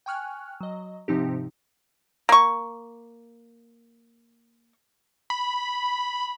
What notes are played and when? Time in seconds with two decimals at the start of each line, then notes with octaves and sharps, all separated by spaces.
0.06 G5 G#5 C#6 F6 F#6
0.61 F#3 D#5
1.08 G#2 C3 F3 C4 D#4 G4
2.29 A#3 C#6
5.30 B5